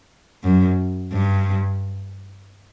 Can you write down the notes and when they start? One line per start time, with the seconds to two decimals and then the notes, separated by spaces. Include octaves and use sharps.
0.43 F#2
1.12 G2